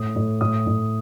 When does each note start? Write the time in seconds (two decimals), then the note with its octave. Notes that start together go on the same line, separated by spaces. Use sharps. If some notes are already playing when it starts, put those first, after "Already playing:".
Already playing: A2 D#6
0.16 A2
0.41 A2 D#6
0.67 A2